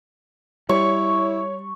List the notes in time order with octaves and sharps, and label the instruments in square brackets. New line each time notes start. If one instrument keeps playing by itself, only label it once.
[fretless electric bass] G3 [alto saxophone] E4 [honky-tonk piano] C#5 [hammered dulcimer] C#6